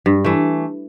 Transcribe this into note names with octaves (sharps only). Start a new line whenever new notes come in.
G2
E3 A3